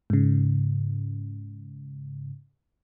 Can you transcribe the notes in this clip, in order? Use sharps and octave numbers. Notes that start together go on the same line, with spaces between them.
G#2 C#3